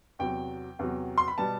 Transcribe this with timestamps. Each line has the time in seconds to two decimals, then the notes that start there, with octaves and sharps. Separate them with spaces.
0.19 E2 C3 F#3 G5
0.79 E2 C3 F#3
1.18 C6
1.28 B5
1.38 B2 G3 B3 A5